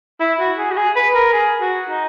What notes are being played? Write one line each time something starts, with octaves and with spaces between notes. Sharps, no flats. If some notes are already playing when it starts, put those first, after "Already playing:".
E4
F#4
G#4
F#4
G#4
B4
A#4
G#4
F#4
D#4